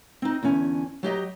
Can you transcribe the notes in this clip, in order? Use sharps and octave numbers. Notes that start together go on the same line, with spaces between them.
C4 D#4
E2 D3 C#4 G#5
F#3 G4 D#5 A#5